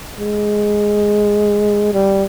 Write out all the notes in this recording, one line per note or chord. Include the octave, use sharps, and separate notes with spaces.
G#3
G3